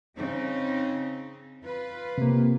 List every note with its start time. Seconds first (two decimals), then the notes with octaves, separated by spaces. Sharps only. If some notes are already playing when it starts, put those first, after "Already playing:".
0.16 C#3 C4 D#4
1.63 F4 B4
2.18 C3 A#3